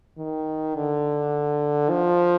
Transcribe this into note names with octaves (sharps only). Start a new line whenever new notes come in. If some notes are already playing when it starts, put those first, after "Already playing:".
D#3
D3
F3